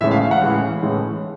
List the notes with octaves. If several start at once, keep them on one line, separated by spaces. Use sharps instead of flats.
A2 E3 G#3 C#4 E5
F5
F5
F#5
A2 E3 G#3 C#4
A2 E3 G#3 C#4